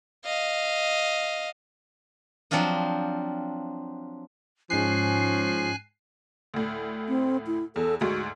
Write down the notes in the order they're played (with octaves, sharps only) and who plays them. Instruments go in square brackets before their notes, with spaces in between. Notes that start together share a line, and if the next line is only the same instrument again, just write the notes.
[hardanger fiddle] D#5 F5
[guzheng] F3 F#3 C4 D4 F4 D#5
[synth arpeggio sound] G#2 C7 [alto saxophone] F3 [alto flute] C#4 [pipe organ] G#5 F#6
[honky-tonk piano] D2 A2
[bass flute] C4
E4
[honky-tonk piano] E2 [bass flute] A4
[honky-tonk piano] D2 G#2 [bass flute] F#4